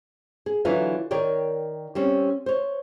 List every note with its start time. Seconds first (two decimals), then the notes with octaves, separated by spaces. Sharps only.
0.46 G#4
0.65 D3 E3 F#3 F4 B4 F5
1.11 D#3 A#4 C#5 D5 G5
1.95 G3 C4 C#4
2.46 C5 C#5